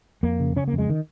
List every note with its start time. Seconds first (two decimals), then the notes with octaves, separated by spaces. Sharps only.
0.23 F2 A#3
0.40 C#3
0.56 C#3 C#4
0.68 A#3
0.73 F2
0.78 G#3
0.90 D#3